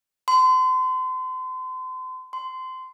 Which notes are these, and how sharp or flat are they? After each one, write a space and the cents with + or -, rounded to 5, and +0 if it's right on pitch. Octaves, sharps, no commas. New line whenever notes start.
C6 -35
C6 -20